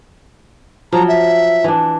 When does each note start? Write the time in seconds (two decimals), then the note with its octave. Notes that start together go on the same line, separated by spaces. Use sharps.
0.92 F3 F#3 A#5
1.08 E5
1.64 E3 D4